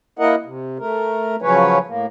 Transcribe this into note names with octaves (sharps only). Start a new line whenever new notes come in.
A#3 E4 A#4 D#5 F#5
C3
A3 A#4
C#3 F3 F#3 C#4 B4 C#5
A2 A#3